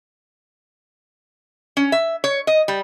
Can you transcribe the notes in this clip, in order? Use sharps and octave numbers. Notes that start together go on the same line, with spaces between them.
C#4
E5
C#5
D#5
G3